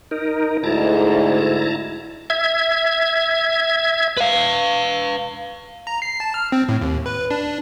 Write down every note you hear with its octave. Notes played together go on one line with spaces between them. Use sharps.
D#4 A#4
D2 G#2 E4 A5 A#5
E5 G#6
B4 F5
A#5
C7
A5
F6
C4
A2
D#2
B4
D4